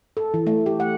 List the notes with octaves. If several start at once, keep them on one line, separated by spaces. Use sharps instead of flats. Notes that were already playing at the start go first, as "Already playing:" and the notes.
A4
E3
A3
G4
F#5